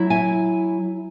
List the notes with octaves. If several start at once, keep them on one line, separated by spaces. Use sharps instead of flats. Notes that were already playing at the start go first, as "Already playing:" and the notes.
Already playing: F#3 E4
E5 G#5